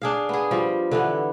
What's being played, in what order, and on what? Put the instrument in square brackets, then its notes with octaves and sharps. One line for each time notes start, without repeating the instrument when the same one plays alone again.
[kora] D4 G#4 F5
B3 G#4
F3 G3
D3 E3 B3